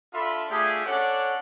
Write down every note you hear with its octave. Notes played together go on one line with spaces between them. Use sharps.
D4 F4 A4 E5 B5 C6
A3 D4 F4 G4 G#4
C#4 D4 A4 C#5 D5 F#5